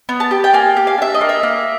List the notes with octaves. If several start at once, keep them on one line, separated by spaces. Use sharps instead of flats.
B3
A5
G4
G5
A#3 G#5
G4
F5
D4 E5
D#5
A#3
E5
A#3